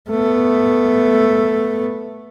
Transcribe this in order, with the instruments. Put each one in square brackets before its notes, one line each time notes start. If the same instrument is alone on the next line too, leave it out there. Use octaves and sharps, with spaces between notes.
[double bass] A3 B3